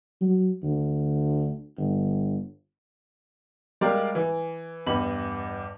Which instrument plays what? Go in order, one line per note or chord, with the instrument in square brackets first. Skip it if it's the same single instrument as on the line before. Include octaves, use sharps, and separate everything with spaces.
[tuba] F#3
D2
G1
[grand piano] G3 G#3 G4 A#4 D5 F5
E3
E2 G2 D#5 B5 F#7